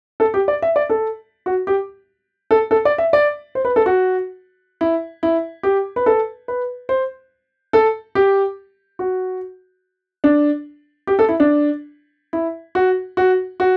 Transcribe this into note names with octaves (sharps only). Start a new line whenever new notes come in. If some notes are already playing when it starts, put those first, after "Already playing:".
A4
G4
D5
E5
D5
A4
F#4
G4
A4
A4
D5
E5
D5
C5
B4
A4
F#4
E4
E4
G4
B4
A4
B4
C5
A4
G4
F#4
D4
G4
A4
E4
D4
E4
F#4
F#4
F#4